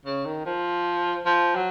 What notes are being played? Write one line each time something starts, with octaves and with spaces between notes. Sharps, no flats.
C#3
D#3
F3
F3
F#3